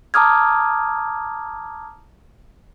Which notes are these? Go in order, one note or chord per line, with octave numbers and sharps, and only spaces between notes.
A5 A#5 D6 D#6 F6 G#6